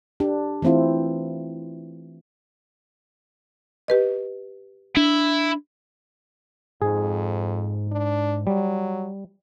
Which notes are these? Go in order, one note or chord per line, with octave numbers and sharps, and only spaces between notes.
D4 G4
E3 A3 C4 E4 F4
G4 B4 D#5
D4 E4
F2 G#2 G#4
D4
F#3 G3